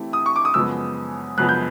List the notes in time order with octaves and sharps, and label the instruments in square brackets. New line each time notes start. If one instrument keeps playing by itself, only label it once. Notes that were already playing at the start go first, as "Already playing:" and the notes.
Already playing: [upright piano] E3 A3 C4 E4 G4
[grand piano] D#6
C#6
D6
D#6
[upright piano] F#2 C#3 F3 G#3 B3 [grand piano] E6
[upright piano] F#2 C#3 F3 G#3 B3 [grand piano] F#6
[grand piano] G6